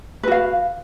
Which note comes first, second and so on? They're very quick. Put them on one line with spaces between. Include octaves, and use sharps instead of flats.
B4 F#4 F5